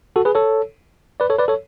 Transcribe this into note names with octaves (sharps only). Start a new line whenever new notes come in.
F#4 A4
G#4 B4
A4 C#5
B4 D5
A4 C#5
B4 D5
A4 C#5